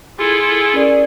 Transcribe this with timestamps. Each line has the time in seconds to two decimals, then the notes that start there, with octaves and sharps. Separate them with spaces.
0.19 E4 F4 G#4 A4
0.73 C#4 A#4 D5